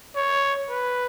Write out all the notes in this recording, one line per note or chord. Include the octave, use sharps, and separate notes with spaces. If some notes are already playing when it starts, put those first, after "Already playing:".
C#5
B4